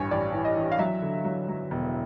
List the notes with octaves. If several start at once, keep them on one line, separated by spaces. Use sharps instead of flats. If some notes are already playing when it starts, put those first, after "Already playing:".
Already playing: A1 G2 C#5 G#5
A1 D5
E3
D#5
E3
F5
F#3 E5
D3
F#3
F#3
E1